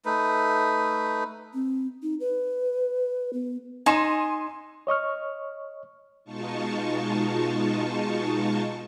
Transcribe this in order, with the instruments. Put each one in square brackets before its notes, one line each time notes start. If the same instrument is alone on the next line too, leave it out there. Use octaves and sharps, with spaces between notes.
[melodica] A3 D#4 B4
[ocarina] C4
D#4
B4
B3
[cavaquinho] D#4 [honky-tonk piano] G#5 C6 E7
[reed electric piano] C#5 D#5 C#6 F6
[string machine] B2 G#3 D#4 F4 A5 C#6